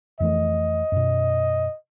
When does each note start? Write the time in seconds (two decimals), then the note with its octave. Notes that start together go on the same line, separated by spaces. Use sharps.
0.20 F2 E3 A3 D#5
0.92 F#2 B2